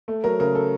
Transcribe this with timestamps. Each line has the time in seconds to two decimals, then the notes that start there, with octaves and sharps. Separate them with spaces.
0.08 A3
0.24 F#3 A#4
0.40 C#3 A#4
0.55 A4